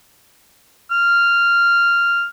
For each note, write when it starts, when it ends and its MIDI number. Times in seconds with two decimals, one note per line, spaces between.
0.92 2.24 89